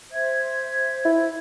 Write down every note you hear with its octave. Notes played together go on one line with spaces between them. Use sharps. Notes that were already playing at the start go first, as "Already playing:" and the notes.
C5 E5 G#6
E4